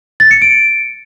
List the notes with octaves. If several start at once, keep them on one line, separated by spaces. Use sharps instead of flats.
A6
C#7
D7